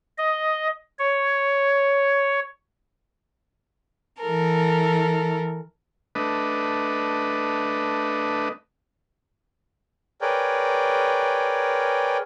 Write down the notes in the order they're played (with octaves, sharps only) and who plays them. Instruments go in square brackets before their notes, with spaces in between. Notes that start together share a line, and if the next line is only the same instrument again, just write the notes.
[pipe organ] D#5
C#5
[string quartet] E3 A4 A#4
[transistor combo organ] A3 D4 B4 D#5
[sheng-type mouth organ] G#4 A#4 B4 C#5 D5 G5